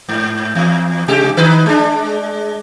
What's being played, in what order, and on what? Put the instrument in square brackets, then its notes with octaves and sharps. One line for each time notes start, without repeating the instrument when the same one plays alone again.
[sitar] G#2
E2
C3 G#3 G4
D#3 D#4 B4
G#3 D4